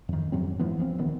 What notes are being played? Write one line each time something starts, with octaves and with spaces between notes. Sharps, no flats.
F2 D#3
F2 G#2 F#3 C4
E3 F3 G#3 B3
B1 F3 C4
D#1 D2 D#3 B3